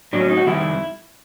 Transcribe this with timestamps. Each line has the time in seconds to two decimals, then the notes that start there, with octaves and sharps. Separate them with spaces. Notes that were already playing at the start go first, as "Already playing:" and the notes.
0.13 A2 F#3 D4
0.20 C#4
0.29 D#4
0.37 F#4
0.46 F2 C3 D#3 G3 E4